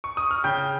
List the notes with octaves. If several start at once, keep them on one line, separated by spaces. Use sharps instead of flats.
C#6
D#6
F6
C#3 G5 G6